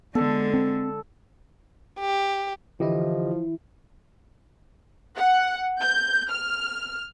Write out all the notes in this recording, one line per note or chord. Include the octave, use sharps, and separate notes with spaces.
D3 G#3 B3 A4
C4
G4
D3 E3 F3 E4 G4 D#5
F#5
G6
F6